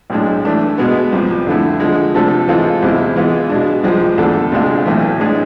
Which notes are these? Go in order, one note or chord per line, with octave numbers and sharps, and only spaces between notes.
B1 A2 G#3 D4
E3 A3 D4
B2 G#3 B3
C2 C3 F3
F2 D3 A3 E4
D3 F3 G#3
C3 F3 A3 D4 A4
E3 G#3 C4 F4 A4
E2 C3 G#3 C4 E4
E3 G#3 B3 F4
B2 G#3 D4
C2 C3 F3 G#3 C4
E2 D3 A3 D4 A4
D2 C3 G#3 D4 F4
B1 A2 E3 A3
A2 G#3 D4 G#4